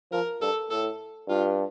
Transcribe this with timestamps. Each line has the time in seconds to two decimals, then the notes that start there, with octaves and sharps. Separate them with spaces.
0.12 F3 A#4
0.41 G2 A4
0.71 A2 A4
1.29 G2 F4